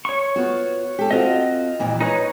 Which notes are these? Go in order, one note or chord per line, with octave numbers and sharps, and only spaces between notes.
C#5 C#6
B3 F4 F#4
G4 A4
C4 F4 F#4 D#5
F2 A#2 E3
D#4 B4 C#5 D#5